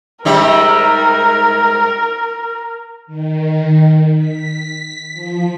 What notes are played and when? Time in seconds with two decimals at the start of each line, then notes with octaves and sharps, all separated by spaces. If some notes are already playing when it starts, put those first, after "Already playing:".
0.25 G#2 G3 A#4 E5
3.07 D#3
4.18 B6
5.13 F3